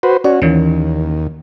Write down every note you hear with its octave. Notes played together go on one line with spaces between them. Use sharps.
F#4 B4 C5
C#4 F#4 D5
D#2 E3 A#3 C#4